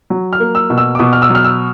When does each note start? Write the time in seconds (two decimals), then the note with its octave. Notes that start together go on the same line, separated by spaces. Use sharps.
0.10 F#3
0.33 F6
0.40 A#3
0.55 E6
0.70 B2
0.78 E6
0.95 D6
0.99 B2 D#6
1.13 F6
1.22 E6
1.30 F#3
1.35 F6
1.44 E6